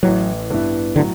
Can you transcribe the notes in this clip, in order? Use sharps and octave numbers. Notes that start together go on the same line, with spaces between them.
A1 A2 E3 F#3
G2 E3 B3 E4
A2 D3 F#3